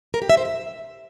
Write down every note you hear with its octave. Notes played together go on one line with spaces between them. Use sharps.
A#4
G4
E5
C5
E5